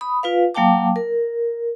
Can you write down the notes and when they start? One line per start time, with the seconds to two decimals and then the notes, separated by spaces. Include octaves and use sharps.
0.01 B5 D#6
0.23 F4 B4 F5
0.54 F#3 A#3 F5 G5 A5 D6
0.96 A#4